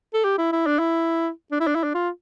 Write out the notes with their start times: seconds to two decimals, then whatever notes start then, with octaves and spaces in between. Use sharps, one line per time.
0.14 A4
0.24 G4
0.38 E4
0.52 E4
0.67 D4
0.79 E4
1.52 D4
1.60 E4
1.67 D4
1.75 E4
1.83 D4
1.94 F4